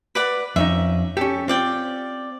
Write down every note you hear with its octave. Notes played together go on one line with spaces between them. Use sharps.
B4 D5 F#5
F2 C#4 D#4 E5
C#4 G4 A4
C4 F4 D5 G5